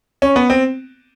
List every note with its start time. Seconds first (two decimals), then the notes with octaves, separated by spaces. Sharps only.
0.22 C#4
0.36 B3
0.50 C4